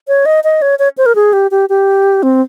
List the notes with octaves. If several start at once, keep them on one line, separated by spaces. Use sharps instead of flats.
C#5
D#5
D#5
C#5
C#5
C5
A#4
G#4
G4
G4
G4
C4